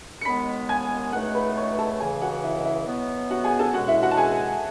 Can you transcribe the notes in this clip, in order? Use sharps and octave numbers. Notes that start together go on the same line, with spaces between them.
C#7
D#2 D#3 G#3 B3 B5 B6
G#5 G#6
C#2 B2 A3 D#4 F#5 F#6
B4 B5
C#5 C#6
A4 A5
C#2 C#3 E3 G#4 G#5
F#4 F#5
E4 E5
D#5
E4 E5
B2 F#3 B3
F#4 F#5
G#4 G#5
A4 A5
C#2 B2 G#3 F#4 F#5
E4 E5
F#4 F#5
A5
G#4 G#5